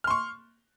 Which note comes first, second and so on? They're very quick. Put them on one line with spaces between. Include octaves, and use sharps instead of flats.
F6 C6 C#6